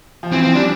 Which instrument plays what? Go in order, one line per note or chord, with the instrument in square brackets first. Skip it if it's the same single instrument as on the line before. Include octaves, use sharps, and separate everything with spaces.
[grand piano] F3
[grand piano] E3 [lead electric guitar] C4
[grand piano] F3 [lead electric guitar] C4
[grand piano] G3 [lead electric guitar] D4